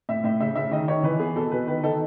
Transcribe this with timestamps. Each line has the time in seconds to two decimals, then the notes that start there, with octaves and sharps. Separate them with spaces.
0.09 A2 E5
0.24 A2 E5
0.40 C#3 E5
0.55 C#3 E5
0.71 D#3 D#5
0.88 D#3 C#5
1.03 E3 B4
1.19 B3 G#4
1.36 B2 A4
1.51 B2 B4
1.67 D#3 B4
1.83 D#3 A4